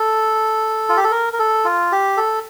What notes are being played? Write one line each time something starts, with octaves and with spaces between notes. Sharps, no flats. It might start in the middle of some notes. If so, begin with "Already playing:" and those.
Already playing: A4
F4
G4
A4
A#4
A#4
A4
F4
G4
A4